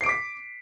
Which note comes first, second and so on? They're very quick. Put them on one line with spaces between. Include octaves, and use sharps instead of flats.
C7 D7 D6 B6